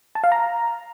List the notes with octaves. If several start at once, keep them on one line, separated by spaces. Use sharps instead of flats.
A5
F5
A#5